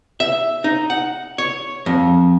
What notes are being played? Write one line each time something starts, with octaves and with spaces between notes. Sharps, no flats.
E5
D#4
F#5
C#5
F2